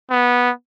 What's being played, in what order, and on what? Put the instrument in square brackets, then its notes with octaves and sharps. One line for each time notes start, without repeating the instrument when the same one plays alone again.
[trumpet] B3